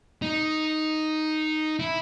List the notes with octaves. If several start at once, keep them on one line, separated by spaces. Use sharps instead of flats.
D#4
E4